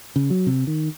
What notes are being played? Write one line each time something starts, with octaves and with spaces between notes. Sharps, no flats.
C#3
F#3
C3
D#3